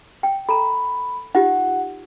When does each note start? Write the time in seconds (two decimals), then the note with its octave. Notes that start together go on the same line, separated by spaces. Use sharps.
0.23 G5
0.49 A4 A#5 B5
1.35 D#4 F4 G4 F#5